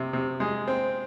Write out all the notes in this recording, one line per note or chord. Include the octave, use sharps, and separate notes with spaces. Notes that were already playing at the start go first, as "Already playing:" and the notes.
Already playing: C3
C3
G#3
C4